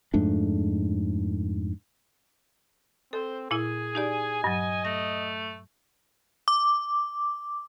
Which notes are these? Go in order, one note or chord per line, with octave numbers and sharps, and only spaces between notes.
F2 G#2 A3 D4
C4 A4 C5
A#2 E4 G#4 G#5
D#4 G4 D5
G2 F#3 D#5
A3 A#6
D6